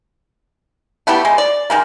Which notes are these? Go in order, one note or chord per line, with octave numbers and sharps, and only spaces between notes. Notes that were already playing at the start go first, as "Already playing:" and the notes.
A3 B3 E4 G4
G#3
D5
D#3 G#3 A#3